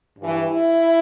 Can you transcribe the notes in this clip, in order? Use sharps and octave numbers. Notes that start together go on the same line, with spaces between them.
G2 E3
E4